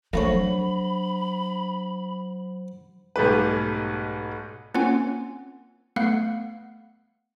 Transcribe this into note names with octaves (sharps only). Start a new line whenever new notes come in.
F2 F#3 A3 D4 C5 C#5 B5
B1 G#2 G3 A3 G4 B4
A#3 C4 C#4 F4 F#5 G#5
A3 B3 F5 F#5 F#6